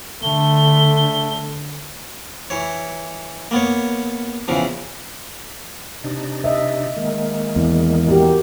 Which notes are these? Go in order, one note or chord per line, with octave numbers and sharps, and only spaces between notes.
D3 A3 G7
E3 C#5
A#3 B3 C#5
E2 C#3 E3 F3
C3 D4 D#4
D#5 E5
D#3 G#3 A#3
E2
F#4 G4 A#4